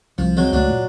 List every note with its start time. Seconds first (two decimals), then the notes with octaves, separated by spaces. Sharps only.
0.18 C2 F3
0.37 F#3 G#3 C4
0.53 C#2 F#3 A3 D4
0.70 A#2